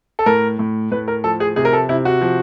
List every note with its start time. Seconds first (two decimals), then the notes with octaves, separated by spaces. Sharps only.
0.19 A4
0.26 A2 A#4
0.59 A2
0.91 A2 B4
1.08 A#4
1.24 F3 A4
1.40 G#4
1.56 C3 G#4
1.65 A#4
1.73 A4
1.89 C3 E4
2.05 F#4
2.21 F3